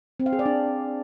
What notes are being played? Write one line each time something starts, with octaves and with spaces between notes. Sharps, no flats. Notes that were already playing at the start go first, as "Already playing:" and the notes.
C4
F5
G#4
D5
D4